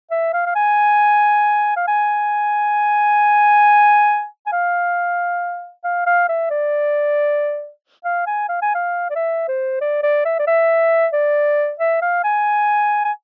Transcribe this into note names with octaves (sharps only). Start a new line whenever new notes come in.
E5
F5
F5
G#5
F5
G#5
G#5
F5
F5
F5
E5
D5
F5
G#5
F5
G#5
F5
D5
E5
C5
D5
D5
E5
D5
E5
D5
E5
F5
G#5
G#5